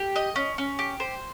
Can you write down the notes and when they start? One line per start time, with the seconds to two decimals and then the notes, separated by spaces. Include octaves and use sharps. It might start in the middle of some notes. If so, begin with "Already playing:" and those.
Already playing: G4
0.16 D#5
0.36 C#4
0.58 C#4
0.79 G4
1.00 C5